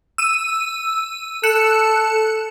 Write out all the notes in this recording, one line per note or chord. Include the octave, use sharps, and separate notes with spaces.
E6 D#7
A4 F#6 C#7 E7